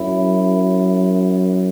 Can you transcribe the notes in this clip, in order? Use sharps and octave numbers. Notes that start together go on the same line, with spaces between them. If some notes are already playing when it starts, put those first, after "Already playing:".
Already playing: F#2 E4